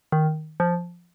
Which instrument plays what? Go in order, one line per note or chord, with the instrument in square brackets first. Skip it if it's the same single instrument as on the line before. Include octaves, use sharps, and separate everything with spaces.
[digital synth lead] D#3
F3